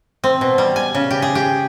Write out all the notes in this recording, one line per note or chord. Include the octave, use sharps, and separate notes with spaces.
C4
B2
G3
G#5
C#3
G4
G#4
G4